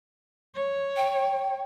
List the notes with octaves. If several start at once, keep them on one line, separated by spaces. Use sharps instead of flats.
C#5
G5